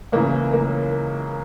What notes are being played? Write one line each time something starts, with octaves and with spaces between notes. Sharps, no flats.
C#2 C#3 E3 A#3
A#3